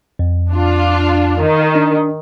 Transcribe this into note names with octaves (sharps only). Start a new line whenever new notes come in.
F2
D4 F4
D#3
D4